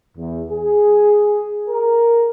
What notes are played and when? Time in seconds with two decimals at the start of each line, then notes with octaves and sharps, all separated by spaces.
0.18 E2
0.50 G#4
1.69 A#4